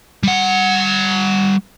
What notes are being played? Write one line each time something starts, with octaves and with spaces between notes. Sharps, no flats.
G3 F#5